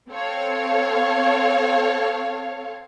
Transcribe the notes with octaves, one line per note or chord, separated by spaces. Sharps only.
C4 A4 C#5 F5